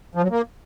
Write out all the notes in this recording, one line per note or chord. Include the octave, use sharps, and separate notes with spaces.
F3
F#3
A#3